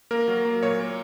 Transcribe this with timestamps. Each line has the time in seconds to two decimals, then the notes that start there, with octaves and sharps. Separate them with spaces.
0.11 A#3 A#4
0.28 F#3
0.45 A#3
0.62 A#2 C#5
0.81 A#3